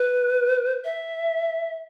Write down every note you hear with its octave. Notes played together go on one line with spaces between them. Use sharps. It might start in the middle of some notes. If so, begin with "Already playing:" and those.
Already playing: B4
E5